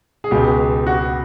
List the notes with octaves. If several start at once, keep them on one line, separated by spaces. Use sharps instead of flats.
G#4
C#2 B2 G#3 G4
F#4